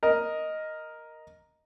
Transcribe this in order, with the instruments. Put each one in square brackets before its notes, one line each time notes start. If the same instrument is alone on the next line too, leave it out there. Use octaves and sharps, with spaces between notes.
[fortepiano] A#4 D#5